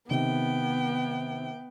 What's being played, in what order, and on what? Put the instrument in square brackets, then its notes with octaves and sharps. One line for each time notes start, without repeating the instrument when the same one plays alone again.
[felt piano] C3 D#3 [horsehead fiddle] B3 [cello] G5